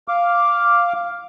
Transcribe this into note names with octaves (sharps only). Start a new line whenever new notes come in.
F5 D6